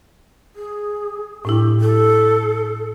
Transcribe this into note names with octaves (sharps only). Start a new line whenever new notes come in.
G#4
A2 D4 E4 G4
A4